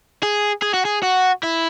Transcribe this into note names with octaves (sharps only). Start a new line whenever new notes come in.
G#4
G#4
F#4
G#4
F#4
E4